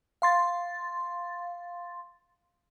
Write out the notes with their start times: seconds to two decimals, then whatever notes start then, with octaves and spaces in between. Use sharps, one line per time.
0.22 F5 C6 A6